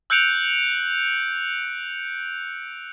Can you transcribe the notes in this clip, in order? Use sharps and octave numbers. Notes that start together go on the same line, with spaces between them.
E6 F#6 G6 C#7 D7 F7